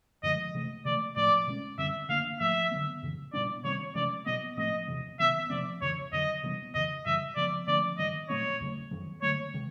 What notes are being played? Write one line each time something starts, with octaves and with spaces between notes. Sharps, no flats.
F#2 D3 F3 G#3 D#5
C3 E3 A3
C3 E3 A3 D5
A2 F3 A3 D5
B2 G#3 C#4
F#2 D3 G3 C4 E5
D3 G3 A#3 D4 F5
G#2 F3 A3 E5
D3 F#3 B3
F#2 C#3 E3
A#2 G3 B3 D4 D5
C3 D#3 G3 C4 C#5
C3 E3 G#3 C#4 D5
B2 F#3 B3 D#5
A2 F3 A3 C4 D#5
E2 C3 E3
C3 D#3 F#3 B3 E5
C3 F3 A3 C4 D5
F2 C#3 E3 C#5
F2 D3 F#3 D#5
C3 E3 G3 B3
F2 C#3 E3 D#5
F#2 C#3 E3 G3 E5
C#3 F3 G#3 B3 D5
D3 F3 A3 C#4 D5
G2 D#3 G3 D#5
A#2 F#3 A3 C4 C#5
E2 C#3 F#3 A3
F#2 D#3 F#3
D3 F#3 A3 C#5
C3 D#3 G#3